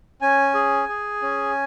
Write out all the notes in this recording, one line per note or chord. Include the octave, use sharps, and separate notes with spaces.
C#4 G#5
G#4
G#4
C#4